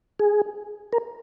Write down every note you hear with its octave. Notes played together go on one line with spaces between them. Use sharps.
G#4
A#4